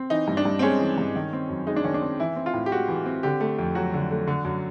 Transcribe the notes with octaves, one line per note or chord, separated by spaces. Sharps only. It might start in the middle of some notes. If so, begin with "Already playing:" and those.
Already playing: C4
E3 D#4
G2
D4
G2
C4
G#3 C#4
E3
G2
D#3
C4
F#2
G#3 D#4
D4
D#3 C#4
D4
C4
E3 E4
C4
F4
A2
G4
G#3 F#4
E3
C4
D3 G4
A3
F2
F#3 F#4
D3
A3
D3
F#2